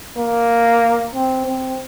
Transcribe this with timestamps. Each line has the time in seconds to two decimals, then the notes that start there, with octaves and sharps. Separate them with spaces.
0.18 A#3
1.14 C4
1.46 C4